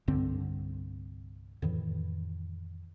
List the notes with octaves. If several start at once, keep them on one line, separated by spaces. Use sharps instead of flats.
C2 G2 D3 C4
F2 A2 D#3 E3